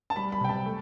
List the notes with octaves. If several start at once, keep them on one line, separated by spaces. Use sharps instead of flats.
A5
G3 B5
B5
C3 G5
A5
A3